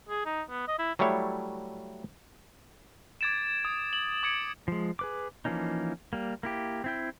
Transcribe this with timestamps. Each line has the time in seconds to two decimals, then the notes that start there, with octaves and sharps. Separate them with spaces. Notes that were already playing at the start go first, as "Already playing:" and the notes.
0.09 G#4
0.26 D#4
0.50 B3
0.68 D#5
0.79 E4
0.99 F#3 G3 A3 E4 C#5
3.21 D6 G#6 A6 D7 E7
3.65 D#6
3.93 F#7
4.23 D6 G#6 C#7 D7
4.68 F3 G#3
4.99 G#4 B4 D6
5.45 E3 F3 A#3 C#4 D#4
6.13 G3 A#3
6.43 A#3 E4 G4
6.84 C4 E4 G5